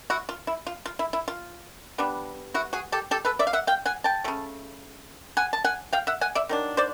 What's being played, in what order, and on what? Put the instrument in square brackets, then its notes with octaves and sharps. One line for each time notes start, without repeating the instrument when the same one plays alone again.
[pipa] E4 F#4
F4
E4
F4
F4
E4
E4
F4
G3 B3 D4
E4 F#4
F#4 G#4
G4 A4
G4 A4
A4 B4
D5 E5
F5
E5 F#5
F5 G5
F#5 G#5
G5 A5
F3 A3
C#3
F#5 G#5
A5
F#5 G#5
F5 G5
E5 F#5
F#5 G#5
D5 E5
D#3 F#3 D4
C5 D5